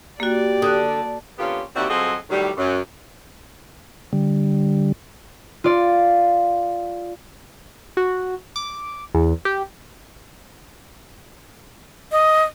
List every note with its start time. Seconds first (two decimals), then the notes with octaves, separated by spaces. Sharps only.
0.20 A#3 F#4 G4 D5
0.62 D3 D#6 F#6
1.38 D3 A#3 B3 C#4 F4 G4
1.76 D#2 C4 D4 E4 F#4 G4
1.89 F#3 C4 F4 G#4 A4 D#5
2.30 A2 D#3 F#3 G3
2.57 F#2
4.13 D3 G3
5.64 F4 D5
7.97 F#4
8.56 D6
9.15 E2
9.45 G4
12.12 D#5